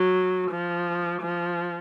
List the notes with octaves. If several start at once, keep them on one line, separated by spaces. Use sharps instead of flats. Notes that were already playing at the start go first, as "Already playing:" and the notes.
Already playing: F#3
F3
F3